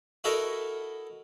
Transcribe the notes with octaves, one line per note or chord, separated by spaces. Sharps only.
E4 F#4 A4 A#4 D#5 E5